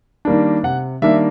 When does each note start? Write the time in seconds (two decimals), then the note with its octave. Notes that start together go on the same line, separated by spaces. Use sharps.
0.25 D#3 G3 A#3 D4
0.63 C3 F#5
1.02 D#3 G3 A#3 D4 E5